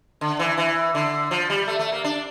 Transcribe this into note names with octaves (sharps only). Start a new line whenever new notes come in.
D3
E3
E3
D3
F3
G3
A3
A3
A#3
D4